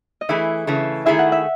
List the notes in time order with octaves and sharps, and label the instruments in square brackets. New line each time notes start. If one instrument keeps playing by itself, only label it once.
[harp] D#5
[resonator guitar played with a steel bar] E3 A3 E4 G#4 [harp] E5
[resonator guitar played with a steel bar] C#3 E3 A3
[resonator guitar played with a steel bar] D#3 A3 E4 G#4 [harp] E5
[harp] F#5
E5